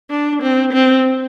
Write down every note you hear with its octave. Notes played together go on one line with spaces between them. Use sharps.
D4
C4
C4